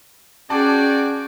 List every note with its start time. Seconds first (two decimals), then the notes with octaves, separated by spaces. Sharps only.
0.50 C#4 F#4 G#4 D5 G5 A5 D6